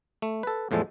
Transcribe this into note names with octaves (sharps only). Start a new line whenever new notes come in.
A3
A4 B4
E2 A2 F3 G#3 A4